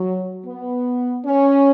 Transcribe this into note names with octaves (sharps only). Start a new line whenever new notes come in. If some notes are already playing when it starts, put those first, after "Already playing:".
Already playing: F#3
B3
C#4